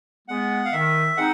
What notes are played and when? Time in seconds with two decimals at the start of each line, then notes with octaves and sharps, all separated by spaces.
0.28 G#3 B3 F#5
0.65 F5
0.72 D#3 E5
1.16 G#3 C4 D#4 F#5